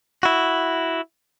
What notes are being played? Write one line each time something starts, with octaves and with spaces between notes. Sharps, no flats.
E4 F#4